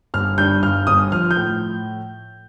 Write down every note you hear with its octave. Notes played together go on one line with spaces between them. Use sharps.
G1 F6
G2 G6
G1 F6
G1 D#6
F3 F6
G6
A2